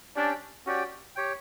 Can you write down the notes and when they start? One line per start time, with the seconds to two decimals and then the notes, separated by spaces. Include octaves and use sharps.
0.16 C#4 D4 G4 D5 G5
0.66 C#4 F#4 G4 D5 G5
1.16 G4 C#5 G5